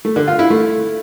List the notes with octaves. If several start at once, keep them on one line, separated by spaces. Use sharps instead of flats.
A3
D3
F4
E4
A3